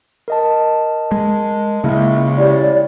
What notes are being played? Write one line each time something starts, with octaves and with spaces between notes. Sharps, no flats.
A#4 D#5 A5
G#3
C#3 G#3 A#3 E4 E5
E4 G4 C#5 D5